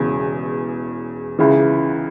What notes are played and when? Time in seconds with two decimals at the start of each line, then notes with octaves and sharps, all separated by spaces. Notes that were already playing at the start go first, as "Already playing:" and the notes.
Already playing: E1 E2 C#3
1.39 C#2 C#3 E3